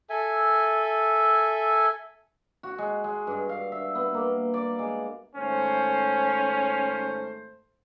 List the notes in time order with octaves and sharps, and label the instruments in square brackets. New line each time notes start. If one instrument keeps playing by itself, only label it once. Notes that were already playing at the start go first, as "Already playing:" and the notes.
[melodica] A4 E5 G#5
[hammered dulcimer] F#4
G#3
G#3
G2
F5
E5
B3
A#3
D5
G#3
[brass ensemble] G#1 A3 C5 [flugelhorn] C#4